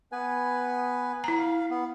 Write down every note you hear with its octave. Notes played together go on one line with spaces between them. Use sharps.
B3 B4 G#5
E4 A#5
F5
B3